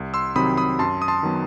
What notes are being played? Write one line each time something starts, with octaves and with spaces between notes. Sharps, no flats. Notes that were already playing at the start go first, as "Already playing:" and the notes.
Already playing: C2
C6 E6
C3 D#3 F#3 C4 B5 D#6
B5 D#6
F#2 A5 C6
D#6
A5 C6
D#3 F#3 B3